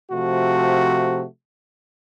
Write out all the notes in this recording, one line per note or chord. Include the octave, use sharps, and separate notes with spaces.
C3 F3 A3 F#4